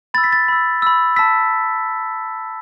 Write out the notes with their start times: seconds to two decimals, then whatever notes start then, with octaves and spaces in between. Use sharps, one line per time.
0.14 B5 E6 A6
0.24 B6
0.33 A6
0.48 B5 E6
0.82 B5 E6
1.16 A5 E6 B6